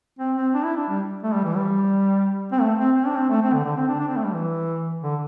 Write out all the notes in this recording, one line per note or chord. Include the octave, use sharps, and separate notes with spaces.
C4
C4
D4
E4
D4
G3
A3
G3
E3
G3
C4
A3
C4
C4
D4
C4
A3
C4
D3
D3
C4
D4
D4
C4
A3
G3
E3
D3